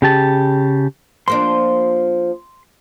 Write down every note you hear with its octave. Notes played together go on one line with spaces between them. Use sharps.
C#3 G4 A5
F3 A#3 D4 C6